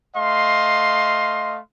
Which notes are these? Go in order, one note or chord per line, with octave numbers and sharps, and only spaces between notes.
A3 D#5 F5 C6